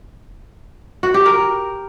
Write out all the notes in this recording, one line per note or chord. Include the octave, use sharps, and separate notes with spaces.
F#4
G4
A#4